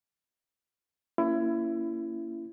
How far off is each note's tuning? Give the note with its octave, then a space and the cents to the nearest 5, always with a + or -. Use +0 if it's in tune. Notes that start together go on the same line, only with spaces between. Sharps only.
A#3 -10 C#4 +20 E4 +25